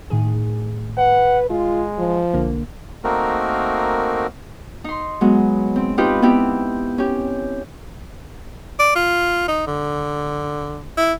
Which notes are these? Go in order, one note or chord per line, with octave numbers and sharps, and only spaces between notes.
A2 D#3 G#4
B4 F#5
G#3 F4
F3
B1 D3 A#3
A3 A#3 C4 D#4 F#4 A#4
D#4 C6
F#3 G#3 B3
C4
C4 D#4 F4 G4 B4 C5
B3 C4 E4 G4
C#4 G4
D5
F4
D#4
D3
E4